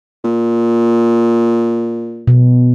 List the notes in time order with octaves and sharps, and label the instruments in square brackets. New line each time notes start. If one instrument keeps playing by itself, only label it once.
[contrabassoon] A#2
[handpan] B2